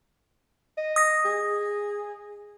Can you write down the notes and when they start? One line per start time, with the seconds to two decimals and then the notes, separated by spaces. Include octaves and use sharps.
0.78 D#5
0.96 D#6 A#6
1.25 G#4